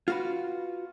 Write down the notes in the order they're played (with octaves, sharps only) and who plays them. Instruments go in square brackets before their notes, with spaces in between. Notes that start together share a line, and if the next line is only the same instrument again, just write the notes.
[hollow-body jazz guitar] F4 F#4 B4